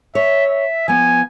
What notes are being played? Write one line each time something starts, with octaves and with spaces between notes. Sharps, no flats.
C#5 E5
E5
F3 B3 G#5